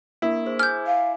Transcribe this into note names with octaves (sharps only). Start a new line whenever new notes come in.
A#3 D4 E4 A#4
G#4 C5
G#5 D6 F6 G6 G#6
F5